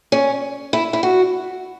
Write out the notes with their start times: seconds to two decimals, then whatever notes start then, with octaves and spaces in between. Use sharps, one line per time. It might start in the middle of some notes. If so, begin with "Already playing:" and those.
0.12 C#4
0.73 E4
0.93 E4
1.03 F#4